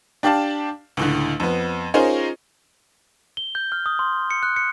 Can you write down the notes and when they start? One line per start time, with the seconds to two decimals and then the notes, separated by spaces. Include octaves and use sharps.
0.23 D4 G4 D5 F5 A5
0.97 C#2 A2 D3
1.40 F2 B3
1.94 C#4 D#4 F4 G#4 A#4 C5
3.37 G7
3.55 G6
3.72 F6
3.86 D#6
3.99 C6
4.31 C#7
4.43 F#6
4.56 C#7